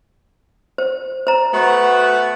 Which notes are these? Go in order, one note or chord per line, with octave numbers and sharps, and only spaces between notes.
C5
C5 A#5
A3 B3 F#4